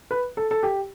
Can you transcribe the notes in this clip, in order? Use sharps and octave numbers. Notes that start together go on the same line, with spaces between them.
B4
A4
A4
G4